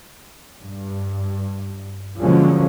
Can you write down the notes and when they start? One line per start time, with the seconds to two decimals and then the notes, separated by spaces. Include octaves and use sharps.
0.61 G2
2.19 D3 F3 F#3 G#3 A#3 C#4